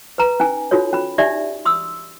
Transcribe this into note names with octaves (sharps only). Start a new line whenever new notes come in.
B4 A#5
C#4 D#4 G#5
C#4 D#4 F4 F#4 A4 C#5
C#4 B5
D4 D#4 G4 D5 E5
C6 D#6 E6